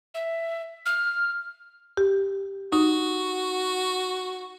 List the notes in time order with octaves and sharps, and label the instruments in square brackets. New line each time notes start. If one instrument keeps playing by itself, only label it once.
[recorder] E5
F6
[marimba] G4
[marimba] D#4 [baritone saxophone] F#4